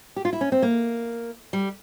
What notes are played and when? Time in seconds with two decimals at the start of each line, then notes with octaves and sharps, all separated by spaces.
0.16 G4
0.25 F4
0.33 E4
0.41 C#4
0.52 C4
0.62 A#3
1.53 G3